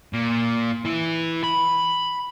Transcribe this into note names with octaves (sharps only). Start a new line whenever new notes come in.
A#2
E3 E4
B5